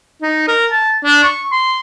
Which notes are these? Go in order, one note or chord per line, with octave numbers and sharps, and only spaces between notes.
D#4
A#4
A5
D4
C#6
C6